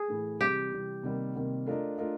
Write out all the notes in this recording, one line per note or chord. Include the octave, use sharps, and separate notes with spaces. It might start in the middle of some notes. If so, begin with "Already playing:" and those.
Already playing: G#4
A2 E3 A3
C3 E3 G3 G4
C3 E3 G3
C3 D#3 G3 A#3
C3 D#3 G3 A#3
A3 D4 F4 A#4 D#5
A3 D4 F4 A#4 D#5